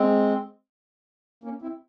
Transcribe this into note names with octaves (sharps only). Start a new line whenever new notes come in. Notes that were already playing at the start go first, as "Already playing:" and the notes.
Already playing: G#3 C4
A#3 C#4
C4 E4